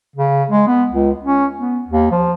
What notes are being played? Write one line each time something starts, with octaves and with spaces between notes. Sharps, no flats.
C#3
G#3
B3
C#2
C#4
B3
D#2
F3